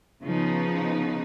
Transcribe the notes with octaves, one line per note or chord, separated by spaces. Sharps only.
C#3 F3 B3 D#4